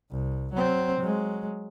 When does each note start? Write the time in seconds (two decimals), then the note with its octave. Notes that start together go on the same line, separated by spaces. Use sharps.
0.11 C2
0.53 F#3 C4
1.00 F#3 G#3